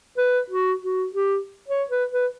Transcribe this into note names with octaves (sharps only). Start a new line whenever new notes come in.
B4
F#4
F#4
G4
C#5
B4
B4